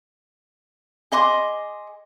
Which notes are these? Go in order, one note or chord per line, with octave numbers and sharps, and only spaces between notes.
G#4 D#5 C6 D6